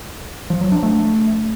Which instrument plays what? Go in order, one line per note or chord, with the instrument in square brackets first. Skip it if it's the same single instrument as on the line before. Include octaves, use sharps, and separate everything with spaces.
[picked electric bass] F3
F#3
D4
A3